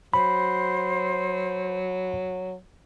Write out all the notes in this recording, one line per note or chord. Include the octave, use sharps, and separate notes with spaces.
F#3 C5 B5